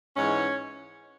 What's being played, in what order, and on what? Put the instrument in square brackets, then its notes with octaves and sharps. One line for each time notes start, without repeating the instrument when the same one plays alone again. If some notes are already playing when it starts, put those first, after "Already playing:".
[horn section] G#2 E3 G#3 C#4 C#5